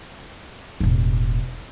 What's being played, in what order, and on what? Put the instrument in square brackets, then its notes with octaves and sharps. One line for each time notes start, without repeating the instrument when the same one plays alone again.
[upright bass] E1 A1